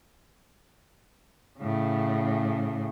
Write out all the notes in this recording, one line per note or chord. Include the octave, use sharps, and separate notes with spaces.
A2 C#3